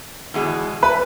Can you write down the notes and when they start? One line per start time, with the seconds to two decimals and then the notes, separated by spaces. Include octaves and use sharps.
0.34 E2 B2 G#3
0.83 B4 B5